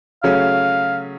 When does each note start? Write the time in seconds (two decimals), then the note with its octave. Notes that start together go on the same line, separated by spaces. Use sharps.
0.23 C#3 F#3 A3 C#4 F5